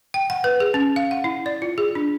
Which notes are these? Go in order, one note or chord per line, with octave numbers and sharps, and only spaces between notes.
G5
F#5
B4
G#4
C#4
F5
F#5
E4
D5
F4
G#4
D4